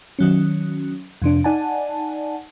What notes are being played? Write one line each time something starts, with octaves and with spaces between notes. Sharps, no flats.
D#3 F#3 C#4
F2 C3 D4
D#4 D5 F#5 G#5 A5